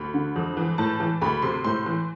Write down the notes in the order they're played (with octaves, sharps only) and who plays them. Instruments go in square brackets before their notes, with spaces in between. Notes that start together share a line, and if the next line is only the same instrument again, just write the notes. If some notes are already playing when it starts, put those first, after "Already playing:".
Already playing: [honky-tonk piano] D2 B5
D3
F2
E3
A2 A5
E3
D2 B5
C3 C6
A2 C6
E3